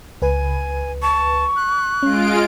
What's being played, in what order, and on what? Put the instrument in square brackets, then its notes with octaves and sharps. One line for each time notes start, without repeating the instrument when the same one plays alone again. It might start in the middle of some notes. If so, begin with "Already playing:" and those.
[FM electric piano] C#2 B4 [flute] G#5
[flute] A5 [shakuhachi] C#6
[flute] F#6
[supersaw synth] G#3 F4 D7 [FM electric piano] C#4